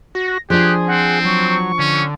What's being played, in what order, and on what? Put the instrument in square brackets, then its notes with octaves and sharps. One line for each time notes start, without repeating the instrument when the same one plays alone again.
[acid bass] F#4 [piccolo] A#6
[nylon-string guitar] F3 D4 [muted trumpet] G4 [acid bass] G#4 [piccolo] F#6
[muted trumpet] C4 [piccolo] F#5
[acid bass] F#3 [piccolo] C#6
[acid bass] D3 [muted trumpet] C#4